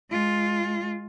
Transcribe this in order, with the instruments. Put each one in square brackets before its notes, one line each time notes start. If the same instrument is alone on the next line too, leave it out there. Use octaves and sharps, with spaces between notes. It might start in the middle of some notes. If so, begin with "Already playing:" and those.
[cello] G#3 F4